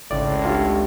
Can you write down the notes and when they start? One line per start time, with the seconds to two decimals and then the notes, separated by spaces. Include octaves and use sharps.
0.11 G#1 C#2 A2 D5
0.45 D4 F4 G4